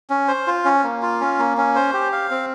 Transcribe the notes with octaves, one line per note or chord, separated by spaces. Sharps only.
C#4
C5
F4
C#4
A#3
F4
C#4
A#3
C#4
C5
G4
F5
C4